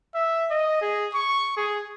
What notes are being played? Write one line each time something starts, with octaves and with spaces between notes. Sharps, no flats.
E5
D#5
G#4
C#6
G#4